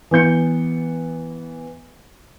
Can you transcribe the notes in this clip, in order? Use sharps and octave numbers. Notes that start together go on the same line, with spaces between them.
E3 B3 G6 C#7